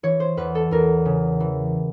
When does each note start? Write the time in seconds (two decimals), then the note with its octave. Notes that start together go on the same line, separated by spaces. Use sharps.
0.03 E3 C#5
0.20 C5
0.37 E2 B4
0.55 A4
0.71 E2 A#4
1.05 C#3
1.40 E3